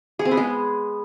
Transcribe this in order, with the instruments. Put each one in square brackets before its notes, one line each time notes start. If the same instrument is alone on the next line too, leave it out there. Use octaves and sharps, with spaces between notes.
[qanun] G#4
C4
B3
G#3